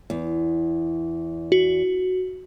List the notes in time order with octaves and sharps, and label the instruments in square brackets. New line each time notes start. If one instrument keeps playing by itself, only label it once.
[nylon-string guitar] E2
[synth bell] F#4